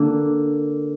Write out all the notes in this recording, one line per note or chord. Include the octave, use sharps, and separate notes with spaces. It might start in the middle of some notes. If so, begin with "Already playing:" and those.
Already playing: D3 A#3